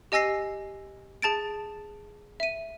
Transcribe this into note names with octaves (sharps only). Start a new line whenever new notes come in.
G4 D#5 G#5 E6 A#6 C7
G#4 A5 A6 D7
E5 D#7